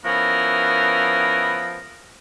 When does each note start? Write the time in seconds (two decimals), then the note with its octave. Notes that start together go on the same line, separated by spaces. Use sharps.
0.05 F3 B3 C#4 E4 A#4